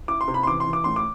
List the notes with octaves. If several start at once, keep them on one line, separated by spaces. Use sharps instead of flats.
E4 D6
C6
C3
B5
C6
E3 D6
C6
E3
D6
A2 C6
D6